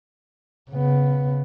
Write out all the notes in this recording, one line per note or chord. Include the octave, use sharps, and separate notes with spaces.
C#3 B3